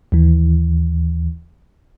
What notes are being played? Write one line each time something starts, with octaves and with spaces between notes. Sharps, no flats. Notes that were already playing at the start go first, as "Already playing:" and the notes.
D#2 E3